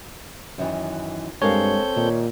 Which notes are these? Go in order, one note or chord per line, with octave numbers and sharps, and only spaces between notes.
F#2 D#3 E3
G2 G#3 C4 A4 A#4 C#5 F5 G6
A#2 D#3